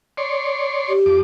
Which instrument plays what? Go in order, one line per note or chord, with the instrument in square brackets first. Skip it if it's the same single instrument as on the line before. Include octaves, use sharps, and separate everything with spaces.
[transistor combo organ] C#5 D5 C6
[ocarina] G4
[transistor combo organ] F2 D6